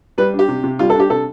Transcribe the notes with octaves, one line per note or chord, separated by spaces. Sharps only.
G3 B4
D4
G4
C3
C3
G3 F4
A4
D4 G4
C3 A4